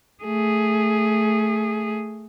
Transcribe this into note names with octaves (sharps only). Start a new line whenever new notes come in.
A3 G#4